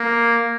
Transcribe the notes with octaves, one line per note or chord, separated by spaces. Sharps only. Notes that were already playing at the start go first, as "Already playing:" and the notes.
Already playing: A#3